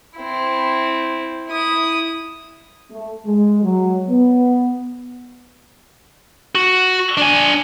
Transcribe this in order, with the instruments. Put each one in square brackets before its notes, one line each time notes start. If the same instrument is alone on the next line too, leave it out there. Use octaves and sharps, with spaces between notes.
[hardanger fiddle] C4 E4
E4 D#6
[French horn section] A3
G#3
F#3
B3
[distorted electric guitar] F#4
D4 G#5